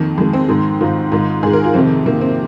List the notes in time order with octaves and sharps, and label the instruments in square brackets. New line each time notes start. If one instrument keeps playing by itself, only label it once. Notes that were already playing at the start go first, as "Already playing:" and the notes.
Already playing: [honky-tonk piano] F2 D#3 A#3
F2 D#3 G#3
C4
G#2 D#3
G#2 D#3 F4
G#2 D#3
G#2 D#3 G#4
A#4
F4
F2 C3 D#3 C4
F2 C3 D#3 A#3
C4